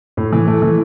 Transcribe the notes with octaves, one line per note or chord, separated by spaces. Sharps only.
A2
E3
A3
E3